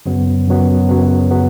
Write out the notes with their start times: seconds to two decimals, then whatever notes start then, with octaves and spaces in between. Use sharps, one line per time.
0.06 F#2 C#3 F#3 B3
0.48 F#2 C#3 F#3 B3
0.89 F#2 C#3 F#3 B3
1.31 C#3 F#3 B3